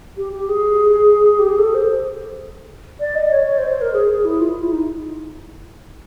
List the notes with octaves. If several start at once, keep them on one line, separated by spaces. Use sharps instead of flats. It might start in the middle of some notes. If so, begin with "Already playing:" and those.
G4
G4
G#4
G4
G#4
A4
C5
D5
D#5
C#5
C#5
C5
C5
A#4
G#4
G#4
E4
F4
E4
D#4